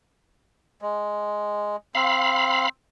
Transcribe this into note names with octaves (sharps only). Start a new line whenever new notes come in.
G#3
C4 F5 B5